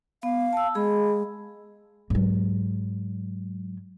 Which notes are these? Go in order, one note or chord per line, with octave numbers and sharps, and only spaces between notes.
B3 F5
A5 E6
G#3 G#4 B5
G#2 F#3